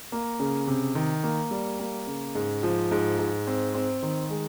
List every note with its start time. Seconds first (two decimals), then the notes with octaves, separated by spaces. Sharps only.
0.12 A#3
0.40 C#3
0.67 C3
0.95 D#3
1.24 A#3
1.51 G3
1.80 A#3
2.07 C#3
2.35 G#2
2.63 F3
2.91 G#2
3.19 G#2
3.47 C4
3.75 C4
4.03 D#3
4.30 G#3